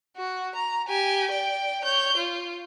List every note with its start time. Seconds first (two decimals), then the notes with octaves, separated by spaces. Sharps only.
0.17 F#4
0.55 A#5
0.88 G4 G#5
1.31 D5 G5
1.84 C#5 G6
2.17 F4